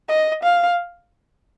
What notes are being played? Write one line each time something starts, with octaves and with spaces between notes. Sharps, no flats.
D#5
F5